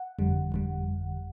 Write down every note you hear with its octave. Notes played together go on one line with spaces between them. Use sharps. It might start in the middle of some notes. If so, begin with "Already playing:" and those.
Already playing: F#5
G1 F2 D3 G3
G1 F2 D3 G3